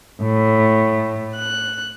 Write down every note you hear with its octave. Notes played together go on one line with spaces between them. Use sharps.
A2
F#6